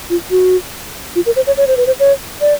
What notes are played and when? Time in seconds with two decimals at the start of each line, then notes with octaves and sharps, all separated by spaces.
0.10 F4
0.31 F#4
1.16 F4
1.26 A#4
1.36 C5
1.47 C#5
1.57 C#5
1.67 C5
1.77 B4
1.87 C5
2.00 C#5
2.41 D5